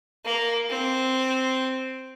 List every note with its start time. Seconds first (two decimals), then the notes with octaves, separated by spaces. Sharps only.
0.25 A#3
0.70 C4